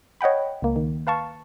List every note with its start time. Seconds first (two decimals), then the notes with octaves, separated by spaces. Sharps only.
0.21 C#5 D#5 F#5 G5 B5
0.62 C#2 A#3
0.76 D#3
1.07 B4 F5 A5 C#6